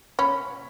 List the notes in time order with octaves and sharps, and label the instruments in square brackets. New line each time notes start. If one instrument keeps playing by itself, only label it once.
[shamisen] C#4 [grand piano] B5